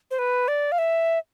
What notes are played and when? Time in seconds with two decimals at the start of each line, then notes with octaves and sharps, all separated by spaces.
0.11 C5
0.19 B4
0.48 D5
0.72 F5
0.78 E5